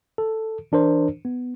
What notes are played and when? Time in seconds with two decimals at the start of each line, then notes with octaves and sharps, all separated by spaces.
0.18 A4
0.72 E3 D4 A#4 C5
1.25 B3